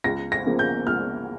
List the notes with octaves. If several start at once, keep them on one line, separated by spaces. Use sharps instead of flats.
C#2 A#6
A#6
C#3 F3 A#3
G6
C#2 F6